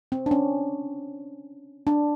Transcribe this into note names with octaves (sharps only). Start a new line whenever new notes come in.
C4
D4
C#4
D4